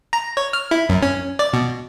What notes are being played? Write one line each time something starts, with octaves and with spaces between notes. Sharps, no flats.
A#5
C#5
F6
E4
F#2
C#4
D5
B2